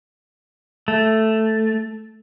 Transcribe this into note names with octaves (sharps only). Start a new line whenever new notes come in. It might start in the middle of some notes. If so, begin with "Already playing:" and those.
A3